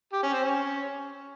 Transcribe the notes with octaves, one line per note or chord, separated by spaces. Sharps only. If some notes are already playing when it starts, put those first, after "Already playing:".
G4
C#4
C4
C#4